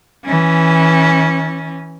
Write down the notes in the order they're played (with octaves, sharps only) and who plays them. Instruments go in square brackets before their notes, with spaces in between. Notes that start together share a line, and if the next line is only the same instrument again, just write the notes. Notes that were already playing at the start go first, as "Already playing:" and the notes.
[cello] E3 C#4